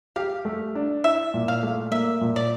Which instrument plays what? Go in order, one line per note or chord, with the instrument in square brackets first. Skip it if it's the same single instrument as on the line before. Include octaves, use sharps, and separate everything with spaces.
[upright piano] G4 [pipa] F5
[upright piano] A3
D4
[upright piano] E4 [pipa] E5
[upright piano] A#2
[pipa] F5
[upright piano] A3
[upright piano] A#3 [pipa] E5
[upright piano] A#2
[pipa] D5